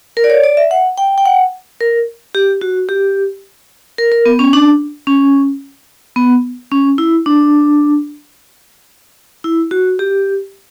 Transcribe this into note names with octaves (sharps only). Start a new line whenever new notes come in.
A#4
D5
C#5
D5
E5
F#5
G5
G5
F#5
A#4
G4
F#4
G4
A#4
A#4
B3
C#4
D4
C#4
B3
C#4
E4
D4
E4
F#4
G4